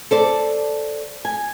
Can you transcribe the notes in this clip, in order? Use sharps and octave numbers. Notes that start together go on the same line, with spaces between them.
A4 C5 D5
G#5